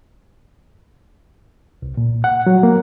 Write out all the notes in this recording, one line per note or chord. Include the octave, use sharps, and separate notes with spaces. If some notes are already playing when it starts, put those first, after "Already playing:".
C2
A#2
F#5
F#3
A#3